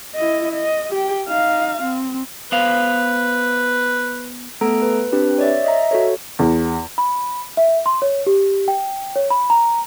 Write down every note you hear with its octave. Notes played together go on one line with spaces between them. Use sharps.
E4 D#5
D#5
G4 G5
D#4 F5
C4
B3 B4 C5 F5
A3 B3 A4 A#5 E6 D7
B4
C4 D4 G4 B4
C#5 D5 E5
D#5 E5 A#5
F#4 A4 C#5
E2
B5
E5
C6
C#5
G4
G5
C#5
B5
A#5